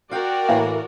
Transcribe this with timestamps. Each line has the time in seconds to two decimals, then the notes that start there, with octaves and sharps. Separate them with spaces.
0.11 F#4 A#4 D5 F5 G5
0.49 A2 E3 A#3